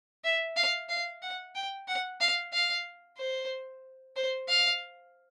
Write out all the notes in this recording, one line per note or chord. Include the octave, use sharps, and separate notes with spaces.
E5
F5
F5
F#5
G5
F#5
F5
F5
C5
C5
F5